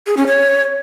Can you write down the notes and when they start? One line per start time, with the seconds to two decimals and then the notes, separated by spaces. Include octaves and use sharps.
0.07 G#4
0.17 C#4
0.27 C#5